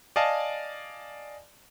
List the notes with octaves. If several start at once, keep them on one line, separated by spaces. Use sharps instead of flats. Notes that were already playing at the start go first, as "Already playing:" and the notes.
D5 D#5 F5 G#5 A5